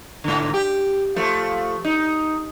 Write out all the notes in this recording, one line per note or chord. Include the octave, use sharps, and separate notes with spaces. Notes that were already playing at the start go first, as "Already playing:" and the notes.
G#2 D3
G4
F3 A3
D#4